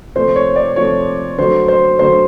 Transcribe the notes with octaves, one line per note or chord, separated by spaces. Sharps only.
C3 F3 A3 C5
C#5
D5
C3 F3 A3 C#5
D3 F#3 A3 C5
C5
D3 F#3 A3 C5